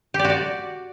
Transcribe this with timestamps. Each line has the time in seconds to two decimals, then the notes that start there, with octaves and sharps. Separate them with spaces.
0.14 G4
0.19 D5
0.25 F#4
0.30 D5